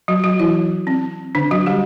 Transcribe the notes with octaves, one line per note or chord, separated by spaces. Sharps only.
F#3 F#4
F#3 F#4
E3 E4
C4
D3 D4
F#3 F#4
G3 G4